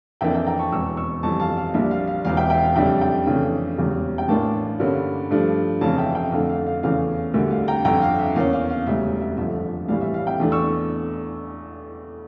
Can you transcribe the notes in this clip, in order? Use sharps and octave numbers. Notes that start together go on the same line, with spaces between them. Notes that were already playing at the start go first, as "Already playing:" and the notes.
F2 E3 A#3 D4 E5 G5
E5 G5
G5 A#5
A5 C#6
E1 E2 E3 C#6 E6
C#6 E6
G1 F2 E3 G3 A5 C#6
F5 A5
F5
A#1 A#2 G3 D4 E5
F5
F5
E1 E2 E3 F5
E5 G5
E5 G5
F5
F2 C#3 G3 D4 E5 G5
E5 G5
F2 C#3 E3 A3 D4
E1 E2 C#3 G3
G5
A1 A2 E3 A#3 D4 F5 A5
G2 D3 G3 A#3 C#4
G2 F3 A3 D4
F1 F2 C#3 E3 F5 A5
E5 G5
E5 G5
F2 D3 A3 D4 F5
F5
F5
E2 C#3 E3 A3 C#4 F5
D2 D3 G3 A#3 E5
F5
G5 A#5
G1 F2 D3 G5 A#5
F5
E5
E2 E3 A#3 C#4 F5
F5
F5
E1 D2 C#3 G3 E5
E5
G1 F2 D3 F3 A3 E5
A#1 A2 E3 G3 F5
E5
F5
E5 G5
E2 E3 A3 D4
C#6 E6